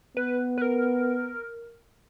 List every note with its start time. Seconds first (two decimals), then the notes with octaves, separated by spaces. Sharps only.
0.16 B3 B4
0.58 B4
0.62 A#4